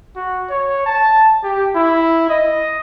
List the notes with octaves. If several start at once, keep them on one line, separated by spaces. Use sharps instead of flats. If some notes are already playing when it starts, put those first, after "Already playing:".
F#4
C#5
A5
G4
E4
D#5